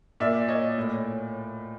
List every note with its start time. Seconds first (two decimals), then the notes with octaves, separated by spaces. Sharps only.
0.20 A#2 D5 E5
0.48 A#2 C#5 D#5
0.78 A2